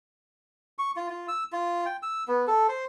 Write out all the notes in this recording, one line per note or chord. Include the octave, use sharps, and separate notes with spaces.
C#6
F4
F4
E6
F4
G5
E6
B3
A4
C5